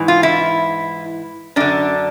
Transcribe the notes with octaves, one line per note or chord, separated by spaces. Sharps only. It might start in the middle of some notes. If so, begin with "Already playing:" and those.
Already playing: G#2 E3
F4
E4
F#2 D3 D4